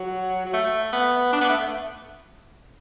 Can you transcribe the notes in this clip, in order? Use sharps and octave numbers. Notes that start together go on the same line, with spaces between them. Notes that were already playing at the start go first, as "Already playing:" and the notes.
Already playing: F#3
F#3
A3
B3
D4
B3
A3